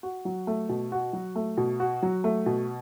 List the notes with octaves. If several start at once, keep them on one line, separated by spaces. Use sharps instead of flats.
F#4
F#3
A3
B2
F#4
F#3
A3
B2
F#4
F#3
A3
B2